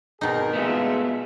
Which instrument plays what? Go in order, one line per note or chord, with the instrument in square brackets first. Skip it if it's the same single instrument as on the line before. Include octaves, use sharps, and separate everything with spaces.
[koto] B2 D#4 [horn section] C4 G#4 A#4
[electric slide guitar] G#3 A3 B3 [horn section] F4 G#4 E5